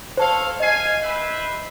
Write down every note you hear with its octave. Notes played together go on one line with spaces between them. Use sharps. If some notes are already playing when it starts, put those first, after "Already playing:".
A4 C5 C#5 F5 A5
D#5 F5 G#5 C7
B4 C5 E5